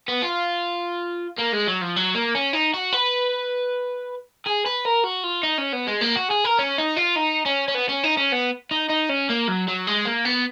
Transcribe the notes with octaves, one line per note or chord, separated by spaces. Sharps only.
B3
F4
A#3
G#3
F#3
F3
F#3
A#3
C#4
D#4
F#4
B4
G#4
B4
A#4
F#4
F4
D#4
C#4
B3
G#3
A#3
F#4
G#4
A#4
C#4
D#4
F4
D#4
C#4
C#4
B3
C#4
D#4
C#4
B3
D#4
D#4
C#4
A#3
F#3
F#3
G#3
A#3
B3